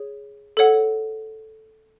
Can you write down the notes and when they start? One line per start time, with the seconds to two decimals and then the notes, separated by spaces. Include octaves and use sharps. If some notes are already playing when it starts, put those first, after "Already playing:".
Already playing: G#4 C#5
0.57 A4 C#5 F#5